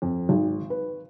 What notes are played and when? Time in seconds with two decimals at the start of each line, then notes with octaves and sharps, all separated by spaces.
0.02 F2
0.29 G#1
0.70 B4